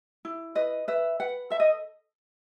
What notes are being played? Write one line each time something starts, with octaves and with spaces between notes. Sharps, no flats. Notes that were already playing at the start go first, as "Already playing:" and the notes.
E4
B4 D#5
B4 E5
B4 F#5
A4 E5
D#5